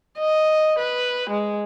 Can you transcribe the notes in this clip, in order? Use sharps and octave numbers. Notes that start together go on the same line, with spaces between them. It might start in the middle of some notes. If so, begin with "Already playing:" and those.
D#5
B4
G#3